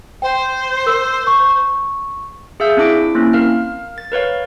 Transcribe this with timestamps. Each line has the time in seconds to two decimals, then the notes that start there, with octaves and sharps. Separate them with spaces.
0.22 C5 G5
0.86 A#4 E6
1.27 C#6
2.60 G#4 E5 F5 E6 G6
2.77 C4 D4 E4 D6 D7
3.15 A#3 C4 C#4 E4
3.33 A#4 F5 F6
3.98 A6
4.12 A#4 B4 C#5 F5